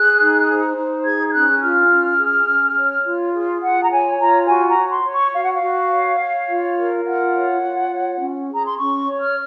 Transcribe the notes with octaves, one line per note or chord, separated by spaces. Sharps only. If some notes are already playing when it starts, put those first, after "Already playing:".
Already playing: G#4 F#6
D#4
C5
D#4
G#4 G#6
G#6
C#4 F#6
F4 F6
C#4
G#4
C#4
C#5
F4
G#4
F4 F#5
A#5
C#5 G#5
F4 A#5
F#4 G#5
A#5
C#5
C6
C#5
C#6
F#4 F5
F#5
F5
F#4
C#5
C#5
F4
A#4
F4 F#5
C#5
F4
C#5
C#4
G#4
A#5
C6
C#4 C#6
C#5
F6